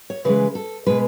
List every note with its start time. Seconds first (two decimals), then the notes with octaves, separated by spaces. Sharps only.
0.10 C#5
0.25 C#3 E3 G#3 B4
0.55 A4
0.87 B2 G#3 B4